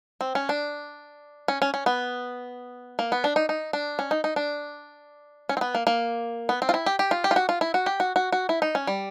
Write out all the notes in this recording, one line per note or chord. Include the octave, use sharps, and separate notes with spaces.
C4
C#4
D4
C#4
C#4
C#4
B3
A#3
B3
D4
D#4
D#4
D4
C#4
D#4
D#4
D4
C#4
C4
B3
A#3
A#3
B3
C4
F4
E4
G4
G4
F4
G4
F4
F#4
F4
E4
F#4
G4
F#4
F#4
F#4
E4
D#4
C#4
G3